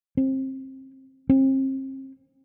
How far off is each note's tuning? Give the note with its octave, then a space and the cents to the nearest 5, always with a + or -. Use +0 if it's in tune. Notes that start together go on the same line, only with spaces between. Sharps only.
C4 +25
C4 +35